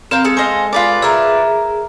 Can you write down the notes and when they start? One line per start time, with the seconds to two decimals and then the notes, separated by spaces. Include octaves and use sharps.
0.11 C4 A#4 F5 G5
0.24 G#3 A4
0.37 C5 D#5 F5 G#5
0.73 F4 B4 D5
1.02 G#4 A#4 E5